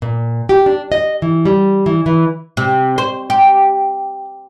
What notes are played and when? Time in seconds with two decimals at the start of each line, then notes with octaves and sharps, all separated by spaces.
0.02 A#2
0.49 G4
0.66 D4
0.92 D#5
1.22 E3
1.45 G3
1.86 E3
2.06 E3
2.57 C3
2.98 C5
3.30 G4